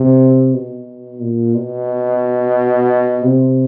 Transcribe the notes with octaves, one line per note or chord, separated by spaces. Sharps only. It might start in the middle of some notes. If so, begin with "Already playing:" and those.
Already playing: C3
B2
A#2
B2
C3